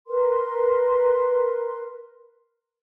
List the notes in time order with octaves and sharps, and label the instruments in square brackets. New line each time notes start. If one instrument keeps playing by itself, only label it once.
[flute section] A#4 B4 C6